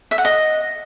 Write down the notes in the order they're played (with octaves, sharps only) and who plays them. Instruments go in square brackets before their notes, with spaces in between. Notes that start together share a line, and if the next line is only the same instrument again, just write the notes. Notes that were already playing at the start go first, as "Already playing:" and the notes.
[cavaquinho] E5
F#5
D#5